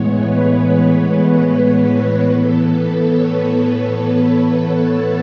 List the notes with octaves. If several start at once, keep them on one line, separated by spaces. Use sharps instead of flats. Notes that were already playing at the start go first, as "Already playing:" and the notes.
Already playing: A2 E3 G#3 B3 C#5
B4
C#5
C#5
B4
A2 E3 B3 A4
B4
C#5
B4
A5